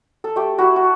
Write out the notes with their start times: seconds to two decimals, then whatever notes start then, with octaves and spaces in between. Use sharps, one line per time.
0.24 A4
0.36 A3 G4
0.58 E4 F#4
0.76 F#4